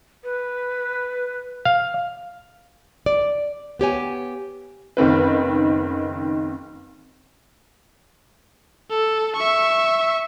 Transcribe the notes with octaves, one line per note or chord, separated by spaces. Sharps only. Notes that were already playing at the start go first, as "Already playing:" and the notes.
B4
F5
D5
B3 G4 C#5 G#5
F#1 D#3 C4 B4
A4
E5 C#6